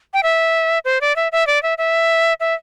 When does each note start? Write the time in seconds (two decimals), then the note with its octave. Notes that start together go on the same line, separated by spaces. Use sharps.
0.14 G5
0.23 E5
0.85 C5
1.01 D5
1.16 E5
1.32 E5
1.47 D5
1.63 E5
1.78 E5
2.40 E5